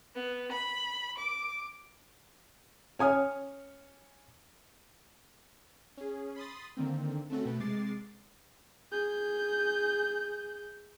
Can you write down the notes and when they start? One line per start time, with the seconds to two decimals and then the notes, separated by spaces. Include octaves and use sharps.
0.15 B3
0.52 B5
1.18 D6
2.99 C#4 G#5 D#6 F6
5.97 C#4 G#4
6.36 B5 C6 D#6 A6
6.77 D3 D#3 A#3 C4
7.30 A3 C4 C#4 F#4 A4
7.45 B2 A3 B4
7.59 C3 G#3 D6 A6 C7
8.92 G#4 G6